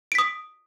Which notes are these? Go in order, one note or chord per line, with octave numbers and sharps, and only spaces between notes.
D#6 B6 D7